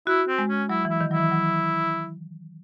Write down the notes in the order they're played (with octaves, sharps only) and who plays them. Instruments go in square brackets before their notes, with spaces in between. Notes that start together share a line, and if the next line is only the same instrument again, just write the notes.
[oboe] E4 [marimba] F#4
[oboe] C4
[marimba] G#3
[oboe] C#4
[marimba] F#3 [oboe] E4
[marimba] E3 [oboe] E4
[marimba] D#3
[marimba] F#3 [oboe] E4
[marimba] E3
F#3